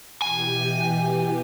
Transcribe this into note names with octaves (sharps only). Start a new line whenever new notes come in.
B2 E3 G4 G#5